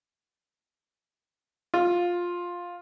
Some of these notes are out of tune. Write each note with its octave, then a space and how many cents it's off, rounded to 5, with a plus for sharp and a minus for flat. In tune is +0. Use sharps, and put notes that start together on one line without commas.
F4 +10